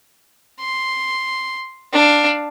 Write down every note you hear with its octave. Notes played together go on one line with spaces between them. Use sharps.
C6
D4 F5